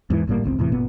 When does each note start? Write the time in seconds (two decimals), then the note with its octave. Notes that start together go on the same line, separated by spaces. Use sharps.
0.10 E2 G#2 D#3 E3
0.27 G1 A2 G3 A#3
0.44 G1 C#2 B2 C4
0.59 E2 A2 C3 E3
0.72 F#1 A#2 B3